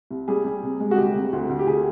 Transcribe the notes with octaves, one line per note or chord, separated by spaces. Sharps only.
C2
G3 G#4
G3
C3
G#3
F#4
D2 G4
C3
D2
D2
G4
D2 G#4